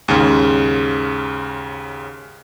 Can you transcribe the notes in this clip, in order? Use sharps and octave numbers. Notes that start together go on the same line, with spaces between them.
D#2 G#2 C#3